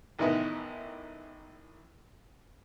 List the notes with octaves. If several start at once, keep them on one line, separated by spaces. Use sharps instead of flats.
A1 D#3 E3 G#3 B3 E4